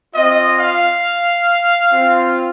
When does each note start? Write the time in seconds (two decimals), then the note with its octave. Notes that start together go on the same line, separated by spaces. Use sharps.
0.14 C4 F4 D#5
0.58 F5
1.90 C4 F4